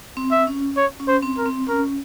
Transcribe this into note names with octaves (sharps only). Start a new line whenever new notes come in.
C4
E5
C#4
C#5
C#4
C5
C4
A#4
C4
C#4 A#4